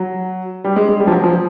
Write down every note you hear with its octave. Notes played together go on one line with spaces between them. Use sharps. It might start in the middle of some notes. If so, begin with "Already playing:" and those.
Already playing: F#3
G3
G#3
G#3
G3
F3
F#3
F3